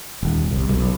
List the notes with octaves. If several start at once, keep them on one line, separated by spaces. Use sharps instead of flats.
D#1
C2
B1